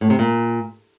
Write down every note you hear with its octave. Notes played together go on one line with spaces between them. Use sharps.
A2
C3
A#2